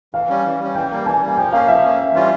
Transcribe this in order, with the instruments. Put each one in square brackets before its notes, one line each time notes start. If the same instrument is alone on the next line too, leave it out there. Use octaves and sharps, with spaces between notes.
[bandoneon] E3 [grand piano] F5
[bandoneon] G3 C#4
E3
G3 C#4
[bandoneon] E3 [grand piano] G5
[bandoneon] G3 A#3
[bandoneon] E3 [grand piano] G#5
[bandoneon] G3 A#3
[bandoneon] F3 [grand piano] G5
[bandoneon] A#3 C#4 [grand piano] F5
[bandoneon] F3 [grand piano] E5
[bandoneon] A#3 C#4
E2
E3 G3 C#4 F4